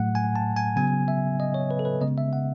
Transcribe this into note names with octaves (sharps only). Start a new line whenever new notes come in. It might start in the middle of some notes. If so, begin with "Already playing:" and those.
Already playing: A2 F#3 A3 F#5
G#5
A5
G#5
C#3 F#3 B3 G#5
E5
D#5
C#5
B4
A4
B4
C#3 G#3 B3 D#5
E5
F#5